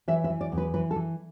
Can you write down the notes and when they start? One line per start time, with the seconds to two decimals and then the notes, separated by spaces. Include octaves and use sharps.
0.08 E3 E5
0.24 E5
0.30 E3
0.41 D5
0.52 E2
0.58 B4
0.74 E3 B4
0.91 A4
0.96 E3